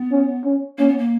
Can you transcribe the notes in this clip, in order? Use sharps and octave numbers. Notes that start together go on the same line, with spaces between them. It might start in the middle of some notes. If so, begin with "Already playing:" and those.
Already playing: B3
C#4
C#4
A#3 C#4
B3
A#3